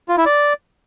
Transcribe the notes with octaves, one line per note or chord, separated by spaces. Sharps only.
F4
E4
D5